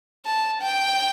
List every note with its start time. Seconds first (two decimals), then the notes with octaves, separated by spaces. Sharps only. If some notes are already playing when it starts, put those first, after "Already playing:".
0.26 A5
0.62 G5